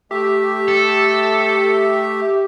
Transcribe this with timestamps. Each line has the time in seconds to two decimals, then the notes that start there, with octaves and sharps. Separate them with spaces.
0.11 A3 G4 E5
0.68 A4